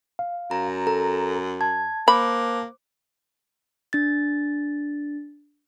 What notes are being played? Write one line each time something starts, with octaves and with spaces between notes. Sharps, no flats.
F5
F#2 A#5
A4 A#5
A5 G#6
A#3 C5 B5 D6
D4 A6